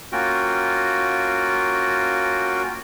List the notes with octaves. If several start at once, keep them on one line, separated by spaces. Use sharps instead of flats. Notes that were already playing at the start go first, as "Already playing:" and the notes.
A#3 C#4 F4 F#4 G5